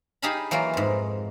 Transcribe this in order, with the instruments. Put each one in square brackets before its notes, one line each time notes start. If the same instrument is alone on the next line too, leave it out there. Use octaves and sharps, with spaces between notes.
[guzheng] D#4 G4 G#4 F5 A5 B5
E3 F#3 A#3 F4 A#4
F2 G#2